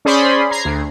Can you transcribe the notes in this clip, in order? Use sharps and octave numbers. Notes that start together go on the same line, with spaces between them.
C#4 G#4 C5 D5 B5 C6
A#5 G#6 C7
D2